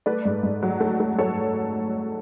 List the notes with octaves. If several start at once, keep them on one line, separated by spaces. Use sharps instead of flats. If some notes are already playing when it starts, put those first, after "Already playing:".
A3 B4 D5
G#2
G#2
F#3
A3
A3
A4 C#5